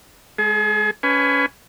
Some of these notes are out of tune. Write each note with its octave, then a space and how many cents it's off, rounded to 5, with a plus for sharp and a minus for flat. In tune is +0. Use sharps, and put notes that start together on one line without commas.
G#3 +0 G#4 +40
C#4 +20 B4 +20 G#5 +0